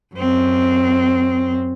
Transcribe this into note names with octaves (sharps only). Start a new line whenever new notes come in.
F#2 C4